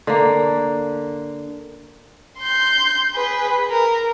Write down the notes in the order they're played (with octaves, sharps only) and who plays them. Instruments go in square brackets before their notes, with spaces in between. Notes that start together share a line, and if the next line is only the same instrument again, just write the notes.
[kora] D3 A#3
[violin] C6 G6
G#4 B4
A#4